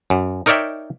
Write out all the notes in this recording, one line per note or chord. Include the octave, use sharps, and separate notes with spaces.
F#2
D#4 A#4 C#5 D5 E5 G5